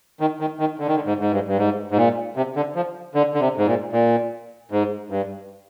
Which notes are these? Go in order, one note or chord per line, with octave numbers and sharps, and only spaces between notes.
D#3
D#3
D#3
D3
D#3
D3
G#2
G#2
G2
G2
G#2
G#2
A#2
C3
D3
F3
D3
D3
C3
G#2
A#2
A#2
G#2
G2